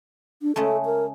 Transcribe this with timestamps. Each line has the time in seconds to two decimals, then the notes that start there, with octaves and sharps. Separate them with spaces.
0.42 D4
0.56 C#3 G#3 A3 A4
0.85 A#4